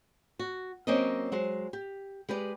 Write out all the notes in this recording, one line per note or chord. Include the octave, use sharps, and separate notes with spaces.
F#4
F#3 A#3 C4 C#4 A#4 D#5
F#3 G#3 C5
G4
G#3 G4 B4 D5